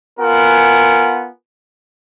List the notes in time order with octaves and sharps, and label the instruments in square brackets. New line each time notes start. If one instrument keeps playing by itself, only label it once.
[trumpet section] B3 F4 A#4 F#5 G#5